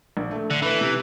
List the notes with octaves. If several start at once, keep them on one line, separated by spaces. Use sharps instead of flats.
A#1
A3
D3
E3 A3 B4
C3